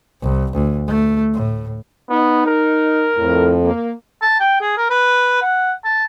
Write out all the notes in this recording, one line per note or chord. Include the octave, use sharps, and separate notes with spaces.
C2
D2
A3
A2
B3 D#4
A#4
F2 A2
A#3
A5
G5
G#4
A#4
B4
F#5
A5